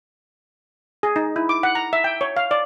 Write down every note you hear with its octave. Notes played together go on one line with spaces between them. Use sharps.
G#4
D#4
E4
D6
F#5
A#5
E5
G5
C#5
F5
D5